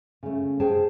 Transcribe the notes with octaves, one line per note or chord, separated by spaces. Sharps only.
C#3 A3
G#4 C5 G5 A5